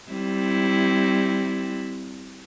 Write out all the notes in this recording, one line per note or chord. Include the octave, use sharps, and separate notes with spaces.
G3 C4 E4